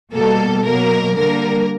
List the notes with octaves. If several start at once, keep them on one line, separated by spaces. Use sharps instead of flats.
B2 G3 A#3 A4
B2 F#3 A#3 A#4
D3 G3 A#3 A#4